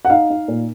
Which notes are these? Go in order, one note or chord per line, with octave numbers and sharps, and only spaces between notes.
F#5
D#4 F5
D#4
A#2